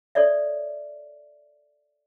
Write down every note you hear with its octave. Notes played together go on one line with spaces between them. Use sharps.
A4 C#5 D5 E5